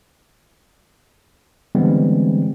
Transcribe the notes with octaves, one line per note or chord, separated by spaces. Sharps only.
D3 E3 G3 G#3 B3 C4